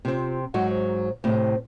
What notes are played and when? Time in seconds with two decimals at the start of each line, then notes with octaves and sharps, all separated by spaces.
0.05 C3 C4 F4
0.54 G#2 F#3 F#4 F#5
0.70 C5
1.24 A2 C3 C5